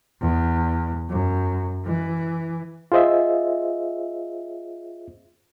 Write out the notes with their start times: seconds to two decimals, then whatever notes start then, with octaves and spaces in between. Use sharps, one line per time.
0.21 E2
1.09 F#2
1.86 E3
2.92 F4 G#4 C5 D#5 E5